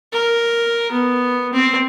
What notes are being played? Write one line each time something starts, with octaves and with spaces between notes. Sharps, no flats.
A#4
B3
C4